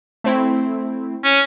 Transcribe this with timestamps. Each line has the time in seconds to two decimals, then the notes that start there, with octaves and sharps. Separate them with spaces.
0.24 A3 C4 E4
1.24 C#4